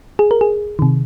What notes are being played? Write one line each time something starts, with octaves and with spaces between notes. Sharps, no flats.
G#4
A#4
G#4
C3 D#3